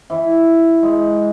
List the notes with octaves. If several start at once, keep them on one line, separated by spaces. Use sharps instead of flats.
E3
G#3